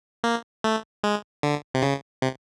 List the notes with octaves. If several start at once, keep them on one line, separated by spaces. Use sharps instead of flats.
A#3
A3
G#3
D3
C3
C#3
C3